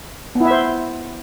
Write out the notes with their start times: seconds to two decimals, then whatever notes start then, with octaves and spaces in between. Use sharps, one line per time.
0.35 B3
0.40 E4
0.46 E5
0.51 C5